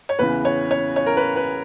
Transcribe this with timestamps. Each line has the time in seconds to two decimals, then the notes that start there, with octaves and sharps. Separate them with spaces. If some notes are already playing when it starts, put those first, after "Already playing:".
0.09 C#5
0.19 E2 C#3 E3 B4
0.45 C#5
0.71 C#5
0.96 C#5
1.06 A#4
1.17 B4
1.36 B4